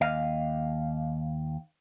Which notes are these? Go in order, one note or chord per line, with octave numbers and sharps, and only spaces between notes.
D#2 D#5 F5